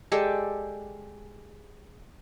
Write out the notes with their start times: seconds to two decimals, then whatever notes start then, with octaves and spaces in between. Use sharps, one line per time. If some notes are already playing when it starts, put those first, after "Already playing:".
0.12 G#3 G4 A4 D5